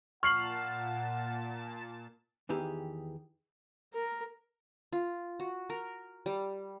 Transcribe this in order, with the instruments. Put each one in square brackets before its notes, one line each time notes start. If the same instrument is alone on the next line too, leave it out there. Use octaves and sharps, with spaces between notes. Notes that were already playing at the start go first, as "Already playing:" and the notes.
[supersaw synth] A#2 A5 [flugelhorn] F#5 [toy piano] C#6 [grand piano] F6 C7 F#7
[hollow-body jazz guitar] E2 D#3 E3 G4 G#4
[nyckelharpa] A#4
[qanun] F4
F#4
A#4
G3